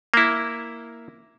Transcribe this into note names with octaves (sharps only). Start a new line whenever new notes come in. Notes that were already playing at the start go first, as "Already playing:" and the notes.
A#3 E4